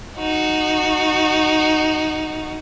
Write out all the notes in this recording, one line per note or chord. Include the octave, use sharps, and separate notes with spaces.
D#4 F#4